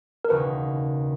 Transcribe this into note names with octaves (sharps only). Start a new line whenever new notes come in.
A#4
E1 D#2 C#3 B4